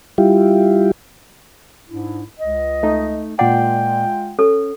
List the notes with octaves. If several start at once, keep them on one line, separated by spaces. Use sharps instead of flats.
G3 E4 F4 G4
G#2 D4 E4
C#2 D#5
A3 D#4
A#2 G#3 F4 D5 F#5 G5
C#4 A4